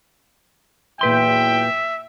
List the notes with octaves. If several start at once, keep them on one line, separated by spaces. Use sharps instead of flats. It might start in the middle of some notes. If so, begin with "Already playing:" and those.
E2 A#2 F#3 B4 E5 G5 C6